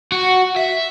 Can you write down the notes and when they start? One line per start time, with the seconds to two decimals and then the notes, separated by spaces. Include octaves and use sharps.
0.12 F#4
0.57 E5